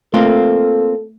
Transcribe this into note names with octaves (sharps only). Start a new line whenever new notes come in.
A3 A#3 C4 F4 A4